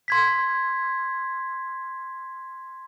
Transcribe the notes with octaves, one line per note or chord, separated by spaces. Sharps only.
C6 G#6 B6